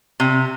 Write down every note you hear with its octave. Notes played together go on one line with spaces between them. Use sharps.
C3